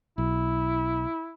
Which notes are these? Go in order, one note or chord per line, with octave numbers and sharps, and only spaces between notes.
B1 E4